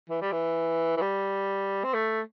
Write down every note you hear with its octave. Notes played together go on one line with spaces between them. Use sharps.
E3
G3
E3
E3
G3
C4
A3